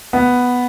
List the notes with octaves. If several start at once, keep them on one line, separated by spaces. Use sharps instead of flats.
B3